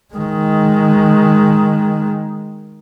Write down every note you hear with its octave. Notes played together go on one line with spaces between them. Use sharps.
D#3 G#3